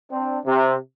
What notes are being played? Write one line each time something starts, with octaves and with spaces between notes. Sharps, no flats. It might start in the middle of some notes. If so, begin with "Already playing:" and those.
C4 D4
C3